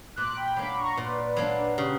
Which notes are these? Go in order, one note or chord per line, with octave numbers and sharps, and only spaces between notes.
A#2 D6 F#6
G5 B5
F#3 A#3 D4 B5 D6
A#5 C#6
A#2 B4 D5
F#3 A#3 D4
C#3 G4 B4